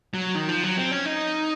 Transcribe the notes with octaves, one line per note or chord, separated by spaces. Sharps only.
F#3
D#3
F3
F#3
C4
C#4
D#4